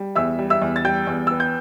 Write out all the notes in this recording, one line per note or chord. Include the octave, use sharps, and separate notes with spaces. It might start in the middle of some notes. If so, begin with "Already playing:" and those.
Already playing: G3
E2 E5 E6
G3
E5 E6
E2
A6
G3 G5 G6
E2
B3 E6
G6